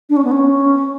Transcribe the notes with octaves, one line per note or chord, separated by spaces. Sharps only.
D4
C#4
B3
C#4